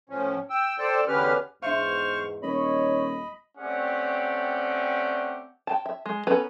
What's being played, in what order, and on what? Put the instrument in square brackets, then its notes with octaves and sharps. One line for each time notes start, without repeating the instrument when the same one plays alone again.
[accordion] A2 F3 C#4
G5 E6
A4 C5 D5 G5 A5
E2 D3 C#4 G4 B4 F6
[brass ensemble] E2 G#2 [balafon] D4 E5 F5 [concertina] C5 C#6 F6
[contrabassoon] D#1 [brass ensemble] D#4 C#5 [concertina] D#5 B5
[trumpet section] A3 C4 C#4 G4 D5 F#5
[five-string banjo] G5 A5
E5
G#3
B3 C#4 A4 B4 A#5